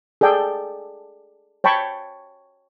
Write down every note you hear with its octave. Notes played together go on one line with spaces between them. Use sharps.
G#4 A4 D5 G5
C#5 G5 A5 B5 C#6